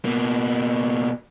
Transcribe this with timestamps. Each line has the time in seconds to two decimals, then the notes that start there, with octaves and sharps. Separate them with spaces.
0.05 B2 A#3